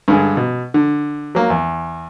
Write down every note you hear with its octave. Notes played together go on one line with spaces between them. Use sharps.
G2 D3 G#3
B2
D3
F#3 A#3
E2